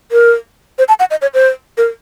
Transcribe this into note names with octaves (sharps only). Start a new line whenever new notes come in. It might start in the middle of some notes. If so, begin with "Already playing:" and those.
A#4
C5
A5
F#5
D#5
C#5
C5
A#4